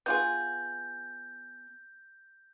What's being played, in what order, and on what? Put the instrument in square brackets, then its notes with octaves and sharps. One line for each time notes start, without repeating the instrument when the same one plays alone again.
[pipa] B3 F4 G#4 [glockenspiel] G6